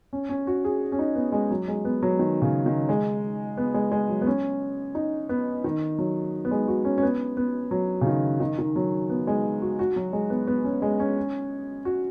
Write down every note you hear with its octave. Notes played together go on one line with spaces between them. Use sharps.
C#4
C#4
F#4
G#4
C#4
D#4
B3
G#3
F#3
G#3
B3
F#3
D#3
C#3
D#3
G#3
B3
G#3
G#3
F#3
B3
C#4
D#4
B3
D#3
F#3
B3
G#3
F#4
C#4
C#4
B3
B3
F#3
C#3
D#3
D#3
D#3
F#3
B3
G#3
F#4
F#4
F#3
G#3
B3
B3
C#4
G#3
C#4
F#4